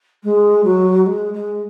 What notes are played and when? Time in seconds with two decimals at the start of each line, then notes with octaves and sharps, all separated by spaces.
0.23 G#3
0.63 F#3
1.06 G#3
1.33 G#3